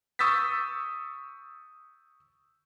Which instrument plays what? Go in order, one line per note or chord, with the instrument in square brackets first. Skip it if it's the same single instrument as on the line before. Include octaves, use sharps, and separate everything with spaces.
[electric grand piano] C#6 D#6 E6 G6 A6 B6